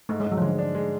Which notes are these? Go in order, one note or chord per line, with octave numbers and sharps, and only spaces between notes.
G#2 A3
G#3
G#2
F#3
F3
D3 G#3
D4
G#3